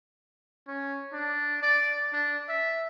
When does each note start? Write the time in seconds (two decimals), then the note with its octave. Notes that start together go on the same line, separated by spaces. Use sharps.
0.67 C#4
1.13 D4
1.62 D5
2.13 D4
2.49 E5